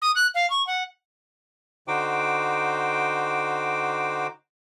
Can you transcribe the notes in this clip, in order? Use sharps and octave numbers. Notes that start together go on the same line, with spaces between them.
D#6
F#6
F5
C#6
F#5
D3 D#4 F#4 C5 G5 D6